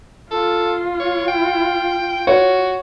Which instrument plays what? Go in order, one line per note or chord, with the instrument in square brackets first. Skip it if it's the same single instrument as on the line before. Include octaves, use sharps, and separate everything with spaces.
[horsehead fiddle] F4 [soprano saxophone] A4
[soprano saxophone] C#5
G5
[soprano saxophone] F#4 [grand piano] C#5